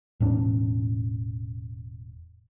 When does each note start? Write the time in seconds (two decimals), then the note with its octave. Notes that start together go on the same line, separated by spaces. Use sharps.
0.20 E1 A2 C#4 D4